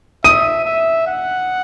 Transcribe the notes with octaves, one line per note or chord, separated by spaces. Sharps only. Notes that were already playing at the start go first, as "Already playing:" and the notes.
E5 D#6 D#7
E5
F#5